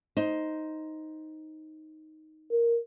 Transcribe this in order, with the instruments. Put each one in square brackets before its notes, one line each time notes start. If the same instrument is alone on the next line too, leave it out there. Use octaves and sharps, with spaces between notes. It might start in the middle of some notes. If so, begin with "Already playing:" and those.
[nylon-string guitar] D#4 C5
[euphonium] A#4